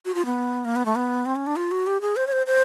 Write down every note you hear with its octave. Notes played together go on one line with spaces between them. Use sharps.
F#4
F4
B3
A#3
B3
A3
B3
C4
C#4
D4
F4
F#4
G4
G#4
C5
C#5
C5
C5